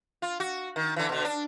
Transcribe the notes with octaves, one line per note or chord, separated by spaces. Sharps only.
F4
F#4
D#3
D3 E3
B2 D3
D4